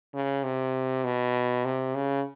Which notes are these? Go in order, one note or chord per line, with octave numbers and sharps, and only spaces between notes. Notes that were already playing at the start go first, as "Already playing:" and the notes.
C#3
C3
B2
C3
C#3